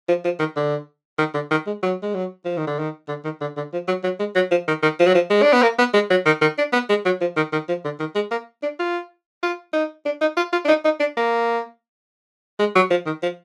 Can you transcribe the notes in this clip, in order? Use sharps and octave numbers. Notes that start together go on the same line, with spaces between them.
F3
F3
D#3
D3
D#3
D3
D#3
G#3
F#3
G#3
F#3
F3
D#3
D3
D#3
D3
D#3
D3
D3
F3
F#3
F#3
G#3
F#3
F3
D#3
D#3
F3
F#3
F3
G#3
D4
B3
A#3
B3
G#3
F#3
D#3
D#3
D4
B3
G#3
F#3
F3
D#3
D#3
F3
D3
D#3
G#3
A#3
D4
F4
F4
D#4
D4
D#4
F4
F4
D4
D#4
D#4
D4
A#3
G#3
F#3
F3
D#3
F3